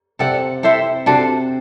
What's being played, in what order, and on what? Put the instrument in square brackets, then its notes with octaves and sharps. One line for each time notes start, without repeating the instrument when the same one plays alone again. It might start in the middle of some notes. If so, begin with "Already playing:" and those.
[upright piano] C3 C4 [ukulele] A4 D5 F#5
[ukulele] E4 A4 C5 E5
[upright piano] C3 C4 [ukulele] D4 F#4 A4 C5